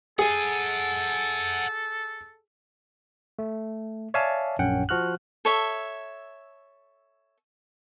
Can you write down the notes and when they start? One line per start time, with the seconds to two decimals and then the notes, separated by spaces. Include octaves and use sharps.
0.19 G#4 A4 F#5 G#5
3.39 A3
4.14 C#5 D5 E5 F5 G#5 A5
4.59 A#1 F#2 C#4 F#5 G5
4.89 F3 F#4 F6 F#6
5.45 A4 C#5 E5